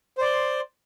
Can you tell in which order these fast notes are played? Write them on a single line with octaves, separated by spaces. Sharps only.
C5 D5 C6